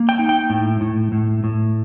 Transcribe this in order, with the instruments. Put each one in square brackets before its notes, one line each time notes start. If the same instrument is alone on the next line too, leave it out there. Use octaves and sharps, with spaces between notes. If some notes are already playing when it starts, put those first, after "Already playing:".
Already playing: [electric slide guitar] A#3
G5
D#4
G5
A2
A2
A2
A2